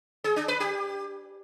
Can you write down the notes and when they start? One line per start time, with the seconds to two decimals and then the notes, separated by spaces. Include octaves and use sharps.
0.24 G#4
0.36 D4
0.48 B4
0.60 G4